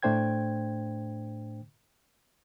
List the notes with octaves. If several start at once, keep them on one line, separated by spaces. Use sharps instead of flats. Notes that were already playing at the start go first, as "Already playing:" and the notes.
A2 A3 D4 C5 G5 G#6